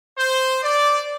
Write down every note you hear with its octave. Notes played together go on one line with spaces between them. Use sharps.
C5
D5